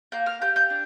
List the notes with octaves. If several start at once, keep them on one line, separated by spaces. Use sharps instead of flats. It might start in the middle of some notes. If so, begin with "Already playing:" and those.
A#3 G6
F6
G4 G6
G6
D4